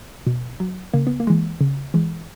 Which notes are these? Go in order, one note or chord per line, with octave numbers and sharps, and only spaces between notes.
B2
F#3
C#3 A#3
B3
A#3
E3 G#3
C#3
E3 G#3